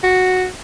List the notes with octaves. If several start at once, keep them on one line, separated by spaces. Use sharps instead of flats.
F#4